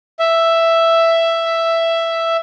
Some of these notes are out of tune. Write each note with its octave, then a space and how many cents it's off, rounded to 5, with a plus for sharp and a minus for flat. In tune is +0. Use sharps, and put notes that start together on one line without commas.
E5 +5